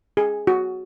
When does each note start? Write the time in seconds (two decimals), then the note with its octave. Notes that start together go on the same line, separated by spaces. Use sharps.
0.17 G#4
0.47 F#4